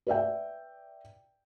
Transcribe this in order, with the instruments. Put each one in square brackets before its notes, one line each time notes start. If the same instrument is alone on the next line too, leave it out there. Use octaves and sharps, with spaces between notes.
[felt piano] B4 D5 E5 G5